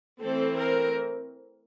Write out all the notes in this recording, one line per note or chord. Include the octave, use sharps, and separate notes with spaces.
E3 A3 C4 A4
A#4